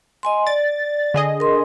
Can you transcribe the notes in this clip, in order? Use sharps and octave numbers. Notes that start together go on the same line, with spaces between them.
D#5 G#5 C6
D5 A6
D3 G#4 D#5
A#4 C6